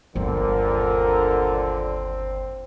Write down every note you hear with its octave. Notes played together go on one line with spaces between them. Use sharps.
G1 D#2 A#2 D3 C4 A#4